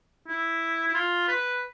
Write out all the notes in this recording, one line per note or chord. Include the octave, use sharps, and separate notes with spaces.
E4
E4
F4
B4